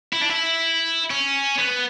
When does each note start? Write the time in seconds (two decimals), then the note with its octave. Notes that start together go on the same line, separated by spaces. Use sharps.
0.13 E4
0.21 D4
0.30 E4
1.10 C#4
1.59 B3